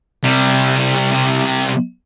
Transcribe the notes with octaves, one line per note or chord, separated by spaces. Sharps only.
C3 G3